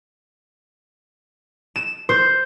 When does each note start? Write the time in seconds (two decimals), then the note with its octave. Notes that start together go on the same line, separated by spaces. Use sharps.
1.76 E7
2.09 C5